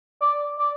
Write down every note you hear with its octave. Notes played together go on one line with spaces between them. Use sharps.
D5
D5